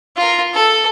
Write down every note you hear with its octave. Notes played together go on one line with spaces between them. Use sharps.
F4 A#4
A4